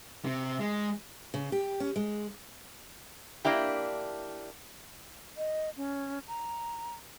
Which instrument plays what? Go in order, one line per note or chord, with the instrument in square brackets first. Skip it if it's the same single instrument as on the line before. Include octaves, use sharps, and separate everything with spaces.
[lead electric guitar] C3
G#3
[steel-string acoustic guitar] C#3
G4
C#4
G#3
[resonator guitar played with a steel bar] A#3 D4 E4 G4
[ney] D#5
C#4
A#5